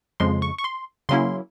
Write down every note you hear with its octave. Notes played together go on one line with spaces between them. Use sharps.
F2 C#3 F3 G#3 C6
C#6
C#6
C6
C#3 F#3 A#3 C#4 E4 C6